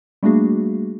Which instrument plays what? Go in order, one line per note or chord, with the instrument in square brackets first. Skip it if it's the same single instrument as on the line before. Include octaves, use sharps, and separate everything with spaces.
[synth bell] G3 A3 A#3 D4 F#4 G#4